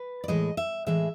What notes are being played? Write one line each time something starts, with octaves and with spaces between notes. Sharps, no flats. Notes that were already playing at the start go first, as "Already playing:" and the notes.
Already playing: B4
D5
A2 E3 G#3 D#5
E5
A2 E3 G#3 E5